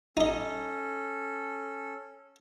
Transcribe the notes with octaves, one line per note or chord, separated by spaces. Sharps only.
C#4 D#4 A4 D#5